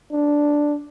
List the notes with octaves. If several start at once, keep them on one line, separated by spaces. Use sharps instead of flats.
D4